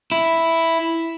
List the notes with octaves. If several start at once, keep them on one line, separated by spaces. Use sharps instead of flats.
E4